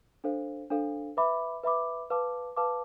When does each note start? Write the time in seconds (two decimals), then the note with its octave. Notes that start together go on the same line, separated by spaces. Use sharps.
0.24 D4 A4 C5 F5
0.70 D4 A4 C5 F5
1.17 B4 E5 B5 D6
1.63 B4 E5 B5 D6
2.10 B4 F5 A5 D6
2.57 B4 F5 A5 D6